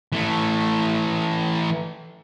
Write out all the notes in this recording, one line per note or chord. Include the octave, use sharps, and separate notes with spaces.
E3 A3